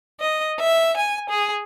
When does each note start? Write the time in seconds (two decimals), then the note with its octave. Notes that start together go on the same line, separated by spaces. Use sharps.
0.20 D#5
0.59 E5
0.96 G#5
1.29 G#4